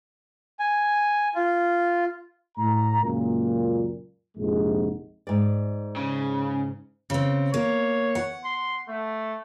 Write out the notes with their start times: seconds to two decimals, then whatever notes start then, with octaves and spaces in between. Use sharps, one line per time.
0.59 G#5
1.35 F4
2.58 A2 A#5
3.02 C#2 F#2 A#2
4.37 A#1 F2 G#2 C3 G#3
5.27 G#2 D5
5.96 C#3
7.10 C#3 C4
7.54 A#3 C#5
8.15 F#5
8.45 C6
8.89 A3